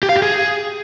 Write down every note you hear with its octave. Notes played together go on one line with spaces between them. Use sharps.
G4
F5
G4
G#4